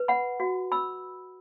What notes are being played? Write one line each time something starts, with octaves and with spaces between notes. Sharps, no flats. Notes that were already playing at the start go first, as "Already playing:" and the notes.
Already playing: B4
F#5 B5
F#4
B5 E6